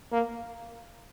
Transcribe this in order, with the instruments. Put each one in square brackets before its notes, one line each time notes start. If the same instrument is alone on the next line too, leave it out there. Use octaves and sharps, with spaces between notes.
[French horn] A#3